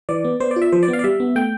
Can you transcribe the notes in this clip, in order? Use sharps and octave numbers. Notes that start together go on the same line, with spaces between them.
E3 D5
B3
B3 C5
D5
F4
E5
F3 C5
D5
B3
F5
D5
G3 E5
B3
A3 G5